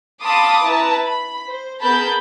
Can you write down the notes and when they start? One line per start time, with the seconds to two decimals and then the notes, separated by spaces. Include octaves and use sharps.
0.21 F5 A5 B5 C6 D6 D#6
0.65 E4 B4 A5 A#5
1.05 B5
1.46 C5
1.81 B3 G#4 A#4 A5 B5 G6